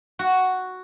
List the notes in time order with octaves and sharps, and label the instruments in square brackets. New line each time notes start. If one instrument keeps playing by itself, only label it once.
[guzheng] F#4